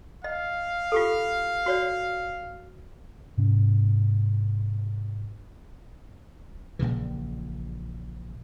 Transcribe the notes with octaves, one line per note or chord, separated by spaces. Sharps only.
D#5 F5
F4 G4 A4
F#4 C#5 D5
G#2 C3 C#4
A#1 A#2 C#3 E3